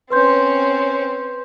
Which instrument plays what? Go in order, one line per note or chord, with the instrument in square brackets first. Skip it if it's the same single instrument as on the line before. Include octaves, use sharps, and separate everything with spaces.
[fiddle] C4 C#4 [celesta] B4 C6 G6